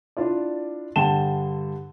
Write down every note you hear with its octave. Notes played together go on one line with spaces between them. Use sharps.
D4 E4 F4 D5
G2 D3 G5 A5 E7 G7